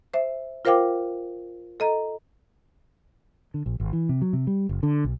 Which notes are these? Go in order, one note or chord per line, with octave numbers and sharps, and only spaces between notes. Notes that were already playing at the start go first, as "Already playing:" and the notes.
C5 E5
F4 A#4 C5 F5 G5 D6
A4 D#5 A#5
D3
A#1
G#1
E3
C3
F#3
C3
G3
F#1
D3
B1